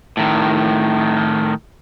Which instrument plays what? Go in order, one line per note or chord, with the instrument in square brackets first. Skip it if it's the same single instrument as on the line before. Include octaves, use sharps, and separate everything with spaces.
[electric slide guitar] A2 D#3